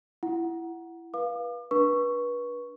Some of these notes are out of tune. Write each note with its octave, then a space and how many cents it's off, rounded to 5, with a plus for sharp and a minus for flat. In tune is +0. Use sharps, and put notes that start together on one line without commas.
E4 +20 F#5 +0
B4 -25 F5 +0 D6 +40
D4 +0 B4 -30 C#6 +0